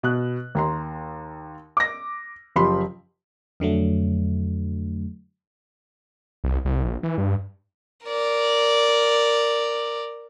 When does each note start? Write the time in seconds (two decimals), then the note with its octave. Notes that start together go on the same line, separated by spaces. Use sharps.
0.03 B2 F#6
0.55 D#2 A#5 C6
1.77 D6 A#6
2.56 F#1 F3 G4 B5 C6
3.60 F2 D3 F#3 A3
6.44 C2
6.65 C2
6.85 A#1
7.03 E3
7.18 G2
8.05 A#4 D5